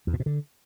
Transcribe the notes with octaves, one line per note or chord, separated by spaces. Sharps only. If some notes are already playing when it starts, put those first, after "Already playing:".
E2
A#2
B2
D3